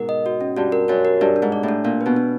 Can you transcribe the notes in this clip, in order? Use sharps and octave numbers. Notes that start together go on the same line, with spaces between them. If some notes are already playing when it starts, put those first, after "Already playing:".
Already playing: G#2 B2 A#4
D#5
F#4
C#4
G2 F#4
A#4
F#2 F#4
A#4
G2 D4
D4
G#2
D5
A2
D4
A#2 D4
B2 B4
D4